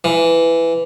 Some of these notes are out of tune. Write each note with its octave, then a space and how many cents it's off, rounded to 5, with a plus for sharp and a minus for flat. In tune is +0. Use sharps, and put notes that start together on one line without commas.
E3 +10